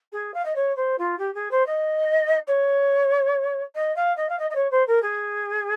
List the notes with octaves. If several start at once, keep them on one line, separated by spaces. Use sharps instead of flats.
G#4
F5
D#5
C#5
C5
F4
G4
G#4
C5
D#5
C#5
D#5
F5
D#5
F5
D#5
D#5
C#5
C5
A#4
G#4